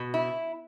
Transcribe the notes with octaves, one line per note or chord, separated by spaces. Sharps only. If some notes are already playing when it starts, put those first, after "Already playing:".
Already playing: B2
E4